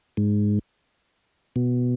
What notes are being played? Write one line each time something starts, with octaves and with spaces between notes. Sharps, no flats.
G#2
B2